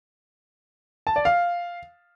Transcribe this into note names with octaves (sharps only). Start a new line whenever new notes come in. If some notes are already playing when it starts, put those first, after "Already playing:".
A5
D5
F5